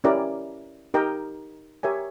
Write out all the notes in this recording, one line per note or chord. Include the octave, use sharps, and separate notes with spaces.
C#4 E4 G4 A#4 D5
D#4 G4 A#4 D#5 G5
G4 A#4 C#5 E5 G#5